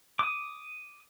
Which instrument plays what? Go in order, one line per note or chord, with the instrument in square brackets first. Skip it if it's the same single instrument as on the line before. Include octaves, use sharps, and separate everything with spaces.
[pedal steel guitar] D6 D#6